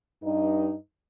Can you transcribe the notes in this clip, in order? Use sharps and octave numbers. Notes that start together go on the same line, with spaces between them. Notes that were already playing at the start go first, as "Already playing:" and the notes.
G2 D#4